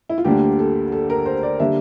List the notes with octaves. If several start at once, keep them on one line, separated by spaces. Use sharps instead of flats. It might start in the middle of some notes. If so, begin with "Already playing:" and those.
E4
F4
D2 D3 G3 A#3 D4 G4
A4
A4
A#4
C5
D5
D3 G3 A#3 D4 E5